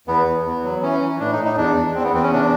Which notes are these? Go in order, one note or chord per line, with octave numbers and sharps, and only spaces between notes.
E2 B3
E2
E2
F#3
E3 C#4
E3
A2 D4
D#4
A2
D#4
E2 D4
E2
E2 C4
B3
E2 C4
C#4
C3 D4